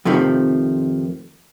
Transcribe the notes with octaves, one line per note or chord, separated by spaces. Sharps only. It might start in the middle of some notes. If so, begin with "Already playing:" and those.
F2 C3 D#3 F3 A3